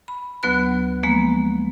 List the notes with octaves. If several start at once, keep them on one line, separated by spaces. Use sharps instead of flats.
B5
D2 F#3 B3 B4 F#6
F3 G#3 A#3 B3